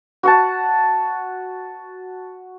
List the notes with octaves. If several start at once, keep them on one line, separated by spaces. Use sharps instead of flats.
F#4 F#5 A5